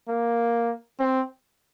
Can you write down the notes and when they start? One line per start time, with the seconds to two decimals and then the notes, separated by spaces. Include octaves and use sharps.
0.08 A#3
0.99 C4